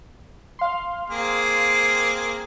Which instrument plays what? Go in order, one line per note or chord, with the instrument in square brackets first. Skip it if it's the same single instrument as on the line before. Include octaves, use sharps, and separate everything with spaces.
[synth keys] F5 C6
[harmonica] A#3 C4 G#4